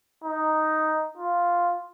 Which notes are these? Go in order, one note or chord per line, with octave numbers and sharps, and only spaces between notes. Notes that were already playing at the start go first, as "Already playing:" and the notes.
D#4
F4